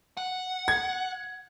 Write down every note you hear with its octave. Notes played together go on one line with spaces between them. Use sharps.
F#5
G#6